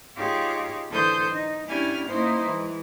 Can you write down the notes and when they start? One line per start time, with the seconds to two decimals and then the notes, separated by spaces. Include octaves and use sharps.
0.16 D#4 F4 G4 G#4 C#5 D6
0.89 D3 E3 A4 C5 D#6 G6
1.29 D#4
1.68 C#4 D4 E4 G4 G#5 F6
2.07 A#3 C#4 D#4 E4 C5
2.43 E3 G#3